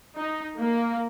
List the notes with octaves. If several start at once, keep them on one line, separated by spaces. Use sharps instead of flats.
D#4
A#3